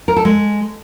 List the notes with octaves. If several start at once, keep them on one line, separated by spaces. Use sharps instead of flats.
A#4
A4
G#3